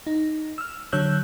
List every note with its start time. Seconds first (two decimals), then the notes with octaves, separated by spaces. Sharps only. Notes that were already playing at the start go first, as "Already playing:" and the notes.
0.07 D#4
0.58 E6 F6
0.92 D3 F#3 C#5 E6 F#6 G6